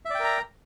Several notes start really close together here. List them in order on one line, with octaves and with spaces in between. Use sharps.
E5 D5 G5 A#4 A#5